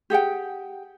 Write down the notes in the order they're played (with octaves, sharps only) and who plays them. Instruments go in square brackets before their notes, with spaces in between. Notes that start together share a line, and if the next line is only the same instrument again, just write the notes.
[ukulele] G4 G#4 F#5 G5